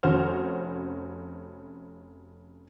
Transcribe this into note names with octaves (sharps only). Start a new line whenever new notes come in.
F1 C#4 F#4 C5 F6